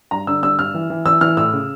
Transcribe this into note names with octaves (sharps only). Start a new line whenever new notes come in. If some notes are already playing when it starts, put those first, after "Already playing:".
G2 A#5
D3 E6
G2 E6
G2 F6
E3
E3
E3 E6
E3 F6
A2 E6
C#3